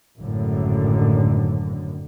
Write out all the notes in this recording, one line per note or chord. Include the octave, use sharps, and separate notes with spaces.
G#1 F#2 A2 D3